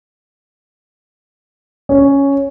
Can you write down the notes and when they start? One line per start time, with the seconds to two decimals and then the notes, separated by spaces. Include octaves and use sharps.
1.89 C#4